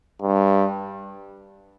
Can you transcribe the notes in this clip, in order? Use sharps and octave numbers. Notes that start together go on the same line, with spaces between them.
G2